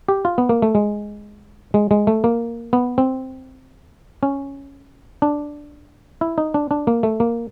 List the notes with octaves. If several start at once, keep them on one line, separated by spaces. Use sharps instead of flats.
G4
F4
B3
A#3
A3
G#3
G#3
G#3
A3
A#3
B3
C4
C#4
D4
E4
D#4
D4
D4
A#3
A3
A#3